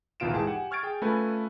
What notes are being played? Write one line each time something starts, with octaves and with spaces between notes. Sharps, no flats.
A#1 D#2 B2 F4 D7 E7
G#2 E3 G#4 G5 A5
G4 F#5 G#5
C#6 F6 G#6 A6 D7
G#4 G5
A3 C#4 F4 A4 B4 G#5